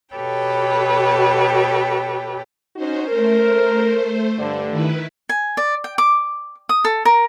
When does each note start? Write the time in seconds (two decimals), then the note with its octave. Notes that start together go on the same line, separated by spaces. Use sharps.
0.15 B2 G4 A4 B4 C#5 G5
2.76 C#4 D#4 F#4 C5
3.08 A3 A#4 C5
4.38 G2 D3
4.70 D#3 E4 B4
5.29 G#5
5.57 D5
5.84 G5
5.98 D6
6.69 D#6
6.85 A4
7.05 A#4